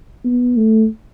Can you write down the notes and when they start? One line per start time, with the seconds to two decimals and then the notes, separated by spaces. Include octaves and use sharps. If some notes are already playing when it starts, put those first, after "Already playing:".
0.25 B3
0.57 A3